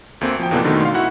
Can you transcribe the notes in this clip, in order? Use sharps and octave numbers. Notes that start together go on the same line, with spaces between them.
D2 A3 A#3 C4
F3 G5
F2 B2 D3 E3 A#3 D4
B2 D3 D#3 A3 D#4
F5 C6
E4 F#4 F#5